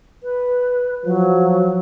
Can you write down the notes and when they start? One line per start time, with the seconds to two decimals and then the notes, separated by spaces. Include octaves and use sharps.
0.23 B4
1.05 F3 F#3